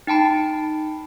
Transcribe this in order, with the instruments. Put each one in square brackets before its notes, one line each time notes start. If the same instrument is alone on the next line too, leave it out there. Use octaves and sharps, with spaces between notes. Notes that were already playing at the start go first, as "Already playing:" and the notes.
[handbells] D#4 G5 A5 B5